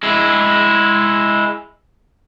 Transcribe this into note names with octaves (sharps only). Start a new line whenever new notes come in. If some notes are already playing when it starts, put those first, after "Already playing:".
G#3 E4